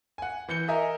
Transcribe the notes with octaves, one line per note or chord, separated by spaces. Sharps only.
F#5 G#5
E3 G6 C#7 G7
A#4 D#5 E5 G#5 A#5